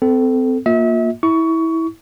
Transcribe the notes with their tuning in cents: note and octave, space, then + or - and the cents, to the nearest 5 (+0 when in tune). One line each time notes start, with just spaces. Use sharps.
C4 -30 A4 +0
A#3 +0 F4 +30 E5 -35
E4 -20 C#6 +20